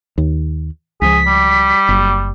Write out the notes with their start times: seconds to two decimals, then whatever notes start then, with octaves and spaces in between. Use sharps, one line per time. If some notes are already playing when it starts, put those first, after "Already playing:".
0.18 D#2
1.02 C#2 F3 G#4 B6
1.27 G3
1.89 F#1